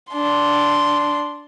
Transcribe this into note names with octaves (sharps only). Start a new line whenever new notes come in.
D4 C6